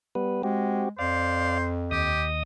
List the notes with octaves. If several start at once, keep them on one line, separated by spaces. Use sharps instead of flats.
G3 B3 B4
G#3 C4 F#4 G4
F2 C5 D5 F5
D#2 G4 D#5 D#6